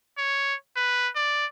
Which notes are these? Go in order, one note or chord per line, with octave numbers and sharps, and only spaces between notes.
C#5
B4
D5